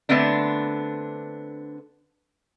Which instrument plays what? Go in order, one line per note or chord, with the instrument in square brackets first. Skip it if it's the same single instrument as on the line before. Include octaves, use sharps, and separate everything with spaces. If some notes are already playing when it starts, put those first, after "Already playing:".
[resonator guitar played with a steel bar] D3 A3 B3 C4 D4